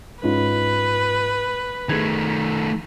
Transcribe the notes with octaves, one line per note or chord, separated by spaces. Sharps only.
G#2 C#4 F4 B4
D#3 A3 G#4 G#6